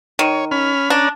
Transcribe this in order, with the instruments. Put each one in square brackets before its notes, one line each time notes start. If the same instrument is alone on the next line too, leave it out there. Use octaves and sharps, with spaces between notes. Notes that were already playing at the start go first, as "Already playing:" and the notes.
[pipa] D#3 [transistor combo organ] C#5
[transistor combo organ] C#4 B5 F6
[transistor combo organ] C#4 D5 A#5 [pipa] D4